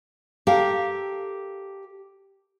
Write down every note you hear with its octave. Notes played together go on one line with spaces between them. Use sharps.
G4 A4 A#4 F5 G5